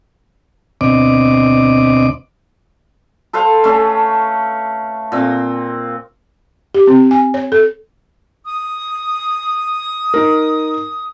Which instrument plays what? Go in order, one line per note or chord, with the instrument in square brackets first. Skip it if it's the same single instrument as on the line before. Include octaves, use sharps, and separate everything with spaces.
[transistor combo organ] D2 B2 C4 D5 D#5 D6
[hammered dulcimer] A4 B4 C5 F5
A3 C#4
A#2 C4
[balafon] G4
C4
G#5
C#5
A4
[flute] D#6
[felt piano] D#4 A#4